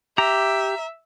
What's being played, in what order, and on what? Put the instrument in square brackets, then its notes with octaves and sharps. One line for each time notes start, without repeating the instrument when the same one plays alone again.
[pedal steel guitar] G4 [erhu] E5 [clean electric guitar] A#5